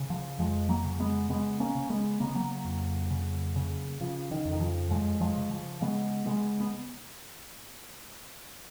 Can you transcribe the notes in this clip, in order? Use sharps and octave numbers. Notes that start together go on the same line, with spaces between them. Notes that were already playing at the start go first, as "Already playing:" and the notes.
Already playing: C#3
F3
F2 F3 G#3
F#3 A#3
C#3
G#3 B3
C#3 G#3 B3
A#3 C#4
C#3
G#3 B3
C#3 A#3
B3
F#3 A#3
F2
C#3
C#3
C#3 F3
D#3
F2
D#3
F3
F#2 F3 G#3
F3 G#3
C#3
F3
C#3 G#3 B3
C#3 G#3 B3
B3